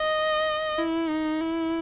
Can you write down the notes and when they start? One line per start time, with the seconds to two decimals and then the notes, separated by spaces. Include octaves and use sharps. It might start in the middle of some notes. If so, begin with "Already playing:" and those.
Already playing: D#5
0.79 E4
1.10 D#4
1.41 E4